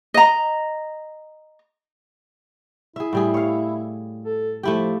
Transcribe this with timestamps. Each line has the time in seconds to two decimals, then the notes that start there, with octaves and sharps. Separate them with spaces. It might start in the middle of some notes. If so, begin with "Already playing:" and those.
0.14 D#5 A#5
2.96 E4 G#4 E5
3.13 A2 G3 G#4
3.34 C#5 F5
4.25 A4
4.63 F3 A3 E4 G4